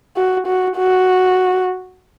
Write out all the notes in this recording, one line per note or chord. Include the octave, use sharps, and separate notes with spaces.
F#4
F#4
F#4